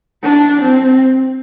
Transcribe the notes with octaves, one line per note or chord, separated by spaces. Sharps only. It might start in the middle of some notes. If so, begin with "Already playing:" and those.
D4
C4